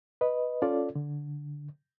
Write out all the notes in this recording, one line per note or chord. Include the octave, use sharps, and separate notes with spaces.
B4 D#5
C#4 F4 A4 D5
D3